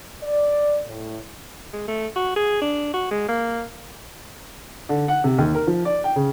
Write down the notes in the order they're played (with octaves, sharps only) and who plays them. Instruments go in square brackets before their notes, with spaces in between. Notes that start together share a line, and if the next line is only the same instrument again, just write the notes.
[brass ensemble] D5
A2
[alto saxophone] G#3
A3
F#4
G#4
D4
F#4
G#3
A#3
[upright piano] D3
F#5
C3
D#2
A#4
F3
D5
G5
C#3